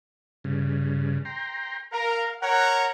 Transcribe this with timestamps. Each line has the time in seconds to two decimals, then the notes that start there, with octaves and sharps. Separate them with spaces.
0.44 G2 C#3
1.25 G5 A#5 C6
1.92 A#4 F5
2.42 A#4 C#5 F#5 A#5